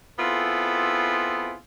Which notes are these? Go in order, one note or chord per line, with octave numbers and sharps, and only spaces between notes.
B3 C4 E4 F4 G#4 A4